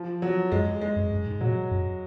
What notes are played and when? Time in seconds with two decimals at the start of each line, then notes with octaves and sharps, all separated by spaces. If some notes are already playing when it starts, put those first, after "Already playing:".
Already playing: F3
0.22 F#3
0.52 F#2 G#3
0.81 G#3
0.96 F#2
1.11 F#2
1.26 G#2
1.41 A#2 F#3
1.71 F#2